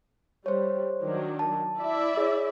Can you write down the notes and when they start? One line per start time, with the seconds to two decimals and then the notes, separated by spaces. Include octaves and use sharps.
0.46 G3 C5 C#5
1.02 D#3 F#3 D4
1.39 A5
1.78 E4 D5 E5
2.17 G#4 C#5